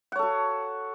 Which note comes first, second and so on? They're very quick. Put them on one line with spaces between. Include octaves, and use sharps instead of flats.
F#5 C#5 A4 F#4